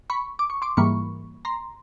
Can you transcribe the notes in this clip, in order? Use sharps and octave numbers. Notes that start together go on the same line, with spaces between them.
B5 C#6
D6
C#6
C6 D6
G#2 E3 G3 A#3 B5 C#6
A#5 C6